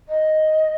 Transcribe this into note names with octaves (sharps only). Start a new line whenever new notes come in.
D#5